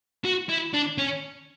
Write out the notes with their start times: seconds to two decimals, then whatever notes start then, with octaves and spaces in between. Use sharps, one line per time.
0.25 F#4
0.49 E4
0.73 D4
0.98 C#4